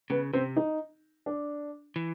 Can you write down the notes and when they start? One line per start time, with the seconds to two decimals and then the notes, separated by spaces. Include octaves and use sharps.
0.10 C#3 B3
0.33 C3 C4
0.57 D#4
1.26 D4
1.96 E3